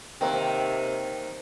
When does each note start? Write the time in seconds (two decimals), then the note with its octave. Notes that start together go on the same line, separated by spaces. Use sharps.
0.21 D#2 C3 D#3 C4 A#4